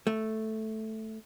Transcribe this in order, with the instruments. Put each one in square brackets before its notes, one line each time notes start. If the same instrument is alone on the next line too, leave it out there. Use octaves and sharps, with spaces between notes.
[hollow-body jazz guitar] A3